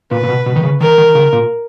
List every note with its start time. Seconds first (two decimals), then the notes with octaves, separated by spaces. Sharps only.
0.11 A#2 B4
0.23 A#2
0.29 B2
0.46 B2
0.56 D#3
0.63 C#3
0.81 D#3 A#4
0.98 D#3
1.15 C#3
1.33 A#2